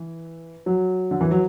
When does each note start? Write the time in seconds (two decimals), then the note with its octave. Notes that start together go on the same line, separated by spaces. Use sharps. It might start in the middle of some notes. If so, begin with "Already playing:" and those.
Already playing: E3
0.66 F#3
1.11 D3
1.21 E3
1.31 F#3